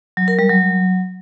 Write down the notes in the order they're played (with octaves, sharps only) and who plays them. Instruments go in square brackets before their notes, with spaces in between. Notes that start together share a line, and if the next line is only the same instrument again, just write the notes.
[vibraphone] F#3
A#4
G3
F#3